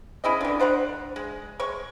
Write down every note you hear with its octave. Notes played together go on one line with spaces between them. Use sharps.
C#4 E4 G#4 D#5
D3 E3
D4 C5 F#5 A#5
G#3
G#3 C#5 C#6